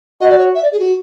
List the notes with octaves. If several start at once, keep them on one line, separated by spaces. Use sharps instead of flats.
F#4 D#5
D5
C#5
E5
D5
G#4
F#4